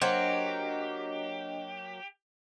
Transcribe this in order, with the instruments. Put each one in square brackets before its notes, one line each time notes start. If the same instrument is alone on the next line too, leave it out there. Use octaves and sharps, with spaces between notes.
[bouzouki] F#3 A#3 [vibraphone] D4 D#5 [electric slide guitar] G4 [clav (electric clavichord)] C5